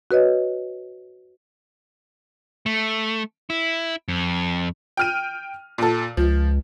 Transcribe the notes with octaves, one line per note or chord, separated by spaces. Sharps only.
F#4 B4 C#5 D#5
A3
E4
F2
G5 F6 D#7
A#2 A4
C#2 F3